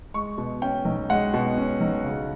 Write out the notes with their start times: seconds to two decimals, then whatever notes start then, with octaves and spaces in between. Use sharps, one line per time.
0.14 G#3 C#6
0.38 B2
0.62 C#4 G5
0.85 B1
1.09 G#3 F#5
1.34 B2
1.57 C#4
1.81 B1
2.04 C#3